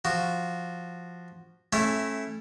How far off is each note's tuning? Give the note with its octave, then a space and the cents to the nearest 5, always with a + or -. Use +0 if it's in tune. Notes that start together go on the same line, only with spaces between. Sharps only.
F3 +0 F#4 +0
A3 -15 C#4 -30 E4 +0